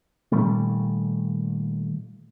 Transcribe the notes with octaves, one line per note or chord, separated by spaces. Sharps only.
A#2 D#3 G3 A3